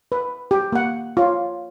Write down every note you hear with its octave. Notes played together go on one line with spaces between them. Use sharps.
B4
G4
A#3 F#5
F4 C#5